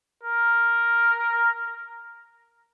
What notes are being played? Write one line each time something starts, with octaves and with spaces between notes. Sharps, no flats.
A#4